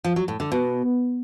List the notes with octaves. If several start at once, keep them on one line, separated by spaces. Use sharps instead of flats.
F3
F#3
A2
D3
B2